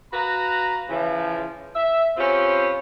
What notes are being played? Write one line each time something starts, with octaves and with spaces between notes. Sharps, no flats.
F#4 B4 F5 A#5
C#3 E3 F3
E5
C4 C#4 F4 G4 B4 C5